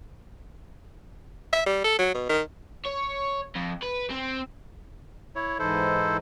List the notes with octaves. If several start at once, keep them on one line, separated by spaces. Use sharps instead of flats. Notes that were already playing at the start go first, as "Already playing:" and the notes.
E5
G3
A4
F#3
B2
D#3
C#5
F2
B4
C4
E4 C#5
G#2 E3 D#4 E4 A4 C5